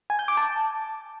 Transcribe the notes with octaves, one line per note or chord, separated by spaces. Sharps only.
G#5
G6
D6
A5